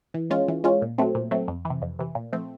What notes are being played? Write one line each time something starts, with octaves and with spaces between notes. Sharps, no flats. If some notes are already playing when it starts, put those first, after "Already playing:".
E3
G#3 C#4 F4
E3
G#3 C#4 F4
A#2
F#3 A3 C4
A#2
F#3 A3 C4
F2
C3 E3
F2
C3 E3
A#2
F3 A3 C4